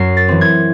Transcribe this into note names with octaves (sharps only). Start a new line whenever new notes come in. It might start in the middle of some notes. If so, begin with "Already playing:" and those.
Already playing: F#2 C7
A6
E3 C4
G#6